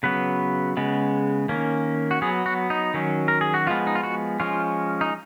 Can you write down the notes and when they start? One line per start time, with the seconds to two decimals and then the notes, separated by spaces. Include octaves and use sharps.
0.03 C#3 F#3 B3 B4
0.77 C#3 G#3 B3
1.49 D#3 A#3 C#4
2.11 F#4
2.22 F#3 B3 G#4
2.46 F#4
2.70 D#4
2.94 D#3 F#3 C#4
3.28 A#4
3.41 G#4
3.54 F#4
3.67 F3 G#3 B3 F4
3.87 D#4
3.95 F4
4.03 F#4
4.40 F3 G#3 C#4 F4
5.01 D#4